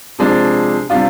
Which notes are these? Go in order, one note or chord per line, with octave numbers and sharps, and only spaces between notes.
C3 F3 G#3 D4
C3 G3 D4 F4